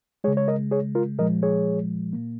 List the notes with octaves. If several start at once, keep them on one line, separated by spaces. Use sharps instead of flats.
C#3 G#3 G#4 C#5
C#5
A#4 D#5
G#4 C#5
F4 A#4
A#2 F3 G#3 A#4 D#5
G#4 C#5
A#2 A#3